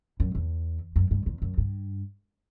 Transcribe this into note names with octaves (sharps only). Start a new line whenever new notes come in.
F#2
E2
F#2
G2
E2
F#2
G2